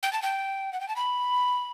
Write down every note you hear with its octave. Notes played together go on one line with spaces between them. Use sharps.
G5
A5
G5
F#5
G5
A5
B5